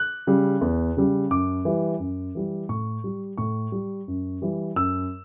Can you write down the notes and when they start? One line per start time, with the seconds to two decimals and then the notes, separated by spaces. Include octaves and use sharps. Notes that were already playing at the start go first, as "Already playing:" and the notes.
Already playing: F#6
0.27 C#3 G3
0.61 E2
0.97 C#3 G3
1.30 F#2 D6
1.65 E3 G3
2.00 F#2
2.35 E3 G3
2.69 A2 C#6
3.04 G3
3.38 A2 C#6
3.72 G3
4.08 F#2
4.42 E3 G3
4.76 F#2 E6